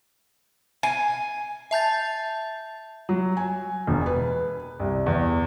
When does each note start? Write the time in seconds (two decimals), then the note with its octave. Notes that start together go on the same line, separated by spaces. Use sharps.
0.83 G#5
1.71 E5 A5 G6 A6
3.09 F#3
3.37 G#5
3.87 E1
4.06 B4
4.80 C2
5.06 E2